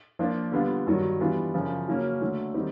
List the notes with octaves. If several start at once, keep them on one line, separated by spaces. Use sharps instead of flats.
F3 A#3 D4 F4
D3 G3 B3 D4 F4
G2 D#3 F#3
E3 G3 B3 D4 F4
F#2 C#3 F3
C#3 F#3 A#3 C#4
D3 F#3 A3
D#3 G3 C4 D#4 G4